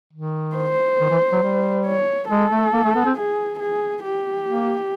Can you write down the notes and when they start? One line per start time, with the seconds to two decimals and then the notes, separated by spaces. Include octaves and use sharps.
0.13 D#3
0.56 C5
1.00 D#3
1.10 E3
1.32 F#3
1.42 G3
1.86 C#5
2.29 G#3 A4
2.51 A3
2.73 A#3
2.84 A3
2.95 B3
3.05 C4
3.16 G#4
3.60 G#4
4.03 G4
4.46 A#3